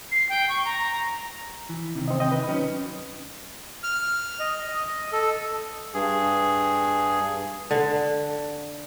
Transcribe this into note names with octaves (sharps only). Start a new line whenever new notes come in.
C7
G5
C#6
A#5
E3
C3 D#3
C4 D#5
D#5 G5
B4
F#3 C#4 D#4
F6
D#5
D#5
A4
G2 G#4
D3